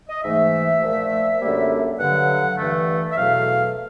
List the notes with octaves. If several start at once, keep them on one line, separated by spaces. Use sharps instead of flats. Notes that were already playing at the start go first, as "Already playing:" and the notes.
D#5
G#2 E3 A3 E5
A#2 F3 A3
F#2 D3 G3 A#3
G2 D3 F#3 F#5
G2 E3 A3
E5
E2 B2 F#3 A3 F5